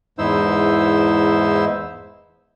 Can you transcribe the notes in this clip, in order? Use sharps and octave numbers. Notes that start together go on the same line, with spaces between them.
E2 G#2 D#4 E4 C5 E6